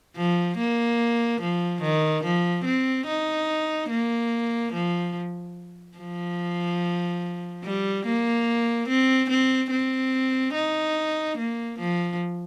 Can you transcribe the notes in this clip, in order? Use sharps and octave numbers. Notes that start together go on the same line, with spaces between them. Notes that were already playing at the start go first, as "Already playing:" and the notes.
F3
A#3
F3
D#3
F3
C4
D#4
A#3
F3
F3
G3
A#3
C4
C4
C4
D#4
A#3
F3